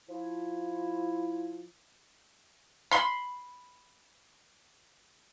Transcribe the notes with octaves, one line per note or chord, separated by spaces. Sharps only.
F3 E4
B5 C6